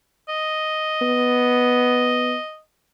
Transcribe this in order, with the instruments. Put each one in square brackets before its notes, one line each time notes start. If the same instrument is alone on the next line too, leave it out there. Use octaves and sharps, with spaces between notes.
[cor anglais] D#5
[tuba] B3